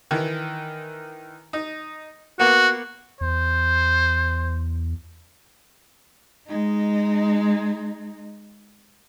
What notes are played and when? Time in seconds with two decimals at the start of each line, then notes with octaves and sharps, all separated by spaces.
0.11 D#3 E3
1.53 D#4
2.39 A#3 B3 F#4
3.21 E2 C5
6.49 G#3 D#4